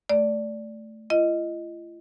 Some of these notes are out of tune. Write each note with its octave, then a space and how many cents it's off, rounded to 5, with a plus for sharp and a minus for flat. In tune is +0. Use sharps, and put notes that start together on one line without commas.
A3 +0 D5 -5
F4 -45 D#5 +0